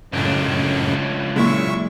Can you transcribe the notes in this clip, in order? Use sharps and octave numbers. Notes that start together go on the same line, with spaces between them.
C#2 F#2 A2 C#3 D4
B1 A#2 C#3 G#3 E4 E5 C#6